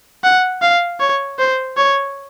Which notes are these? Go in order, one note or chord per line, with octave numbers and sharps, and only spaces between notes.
F#5
F5
C#5
C5
C#5